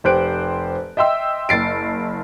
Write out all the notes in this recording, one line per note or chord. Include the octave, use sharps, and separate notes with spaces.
F1 G4 C5 F#6 D7
D#5 E5 G5 C6 E6
F#1 A6 C7 D7